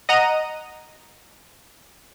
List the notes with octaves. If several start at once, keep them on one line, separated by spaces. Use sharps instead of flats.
D#5 F#5 A#5 D#7